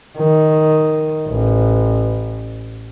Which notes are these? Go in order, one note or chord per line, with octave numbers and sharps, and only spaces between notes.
D#3
A1